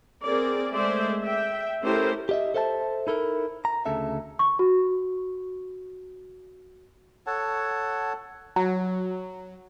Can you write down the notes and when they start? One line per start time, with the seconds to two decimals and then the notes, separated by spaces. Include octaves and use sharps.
0.24 C4 G#4 A#4 D5
0.73 G#3 A3 G#4 C5 D5 E5
1.23 E5 G5
1.82 A3 C#4 E4 G4 A#4 C5
2.29 G4 D#5 E5
2.54 A4 C5 E5 F5 A5
3.07 D#4 E4 A4 A#4
3.65 A#5
3.86 D2 C#3 A4 E5
4.39 C#6
4.59 F#4
7.27 A4 C#5 F#5 A5
8.56 F#3